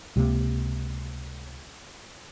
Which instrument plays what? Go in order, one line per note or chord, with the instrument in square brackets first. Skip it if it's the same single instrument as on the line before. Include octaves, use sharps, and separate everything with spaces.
[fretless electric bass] C#2 C3 F#3 A#3